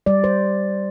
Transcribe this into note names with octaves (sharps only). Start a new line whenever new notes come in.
G3 D5
C5